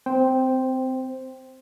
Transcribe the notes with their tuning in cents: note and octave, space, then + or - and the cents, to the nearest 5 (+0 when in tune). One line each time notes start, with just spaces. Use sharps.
C4 -20 C5 +0 G5 +0